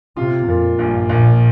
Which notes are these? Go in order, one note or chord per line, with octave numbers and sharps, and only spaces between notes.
C3 F4
F2 A#2
A#1 G2
A#1 A#2